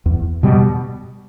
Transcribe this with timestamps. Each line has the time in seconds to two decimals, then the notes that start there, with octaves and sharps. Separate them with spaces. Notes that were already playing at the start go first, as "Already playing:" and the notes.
0.06 E2
0.43 B2 G3